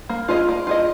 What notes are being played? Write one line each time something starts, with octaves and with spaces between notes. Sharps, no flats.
A#3
F4 G#4 D#5
A#3
F4 G#4 D#5